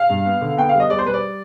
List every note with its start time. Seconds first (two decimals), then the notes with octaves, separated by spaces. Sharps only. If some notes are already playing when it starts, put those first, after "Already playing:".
Already playing: F5
0.10 G2
0.25 B3
0.41 D3
0.57 B3 G5
0.69 F5
0.74 G3
0.80 D#5
0.90 G3 D5
0.98 C5
1.06 G3 B4
1.14 D5